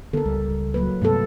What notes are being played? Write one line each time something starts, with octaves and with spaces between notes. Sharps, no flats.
D3 B3 A4 A#4
C#2 G3
F#3 A#3 B4
G2 C3 A3 B3 A4